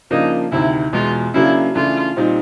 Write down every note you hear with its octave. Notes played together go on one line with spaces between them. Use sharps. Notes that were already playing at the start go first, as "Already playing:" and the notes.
C#3 F3 A#3 D4 D#4
D2 C3 D#3 E4
E2 B2 G#3 F4
C#3 F#3 A#3 D4 E4
C#3 E3 A3 D4 F4
A#2 G3 C4 D#4